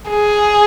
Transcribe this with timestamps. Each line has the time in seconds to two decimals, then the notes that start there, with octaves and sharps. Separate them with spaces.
0.10 G#4